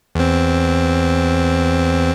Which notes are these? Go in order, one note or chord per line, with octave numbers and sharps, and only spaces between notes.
E2 C4